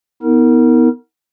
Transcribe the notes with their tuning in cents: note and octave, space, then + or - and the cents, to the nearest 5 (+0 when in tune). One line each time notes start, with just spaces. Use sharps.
B3 +0 D#4 +45 A#4 -20